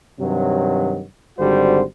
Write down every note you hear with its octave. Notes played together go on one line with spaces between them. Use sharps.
G2 C3 D#3 F#3
G#1 D3 G3 F#4 C5